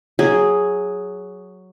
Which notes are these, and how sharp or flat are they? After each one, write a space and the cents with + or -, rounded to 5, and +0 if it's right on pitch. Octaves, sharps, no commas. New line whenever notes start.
F#3 +0 G#4 +0